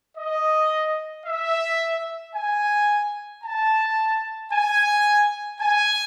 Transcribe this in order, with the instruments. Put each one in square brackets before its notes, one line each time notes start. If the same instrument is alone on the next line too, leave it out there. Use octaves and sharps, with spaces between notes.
[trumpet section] D#5
E5
G#5
A5
G#5
G#5